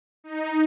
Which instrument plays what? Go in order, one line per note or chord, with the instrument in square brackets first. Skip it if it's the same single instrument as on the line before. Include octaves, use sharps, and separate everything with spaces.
[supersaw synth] D#4